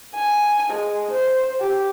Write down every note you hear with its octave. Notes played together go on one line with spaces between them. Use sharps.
G#5
G#3
C5
G4